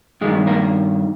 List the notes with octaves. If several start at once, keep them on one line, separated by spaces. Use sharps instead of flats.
G2 D#3 G#3
A#3